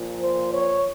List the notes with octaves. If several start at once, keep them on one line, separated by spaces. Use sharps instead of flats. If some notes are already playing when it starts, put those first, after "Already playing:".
Already playing: A#2 F3
C5
C#5